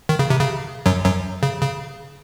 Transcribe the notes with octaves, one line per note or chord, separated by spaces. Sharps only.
D#3
C#3
C3
C#3
F#2 F#3
F#2 F#3
C#3
C#3